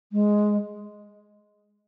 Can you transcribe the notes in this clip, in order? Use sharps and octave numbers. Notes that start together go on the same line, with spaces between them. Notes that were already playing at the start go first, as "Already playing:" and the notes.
G#3